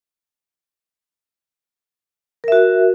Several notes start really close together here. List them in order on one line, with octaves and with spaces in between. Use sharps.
A#4 E5 F#4